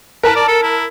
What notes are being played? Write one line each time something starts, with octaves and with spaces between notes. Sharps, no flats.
A#4 B4 A5
D5
A4
E4